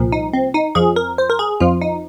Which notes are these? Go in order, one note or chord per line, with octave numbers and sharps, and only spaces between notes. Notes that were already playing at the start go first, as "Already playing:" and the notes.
Already playing: C2 A#2 F3
D#4
C4
D#4
F2 F3 G#4
A#4
C5
A#4
G#4
F2 F3 F4
D#4